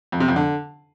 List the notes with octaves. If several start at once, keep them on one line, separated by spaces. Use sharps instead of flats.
F2
C3
F2
D3